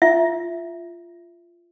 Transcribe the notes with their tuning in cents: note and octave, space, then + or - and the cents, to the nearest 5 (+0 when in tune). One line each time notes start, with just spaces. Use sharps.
F4 -15 E5 +0